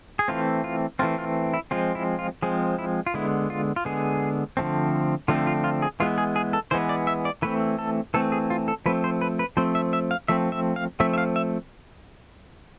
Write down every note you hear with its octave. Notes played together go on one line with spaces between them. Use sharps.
G#4
E3 A3 C4 F4
F4
E3 A3 C4 F4
F4
E4
F3 G#3 C4 F4
E4
F4
F3 G#3 C4 G#4
E4
F4
D3 G#3 B3 E4
F4
F4
D3 G#3 B3 G#4
D3 F3 A3 C4
D3 F3 A3 C4 F4
F4
F4
G#4
E3 G#3 B3 F4
G#4
G#4
A4
E3 G#3 B3 C5
D5
E5
D5
E3 A3 C4 B4
A4
E3 A3 C4 A4
G#4
F4
A4
F3 A3 C4 B4
C5
B4
B4
F3 A3 C4 C5
E5
E5
F5
F3 A3 C4 E5
E5
F5
F3 A3 C4 E5
E5
F5
E5